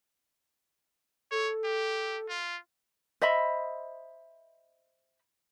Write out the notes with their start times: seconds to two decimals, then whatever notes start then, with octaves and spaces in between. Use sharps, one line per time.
1.31 A4 C#5
1.64 G4
2.29 F4
3.22 C5 D#5 E5 B5